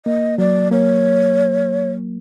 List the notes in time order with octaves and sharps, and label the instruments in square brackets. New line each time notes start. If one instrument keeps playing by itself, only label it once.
[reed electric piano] A#3 [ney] D#5
[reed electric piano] F#3 [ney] D5
[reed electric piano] A#3 [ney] C#5